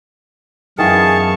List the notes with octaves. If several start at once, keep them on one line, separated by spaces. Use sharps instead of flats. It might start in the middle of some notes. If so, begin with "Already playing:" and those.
F#2 D#3 E3 B3 G#4 F5 A5 C#6